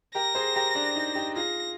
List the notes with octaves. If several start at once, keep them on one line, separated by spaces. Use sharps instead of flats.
G4 A#4 A#6
G#4 C5
G4 A#4
D4
D#4
D#4 G4
F4 G#4 A#6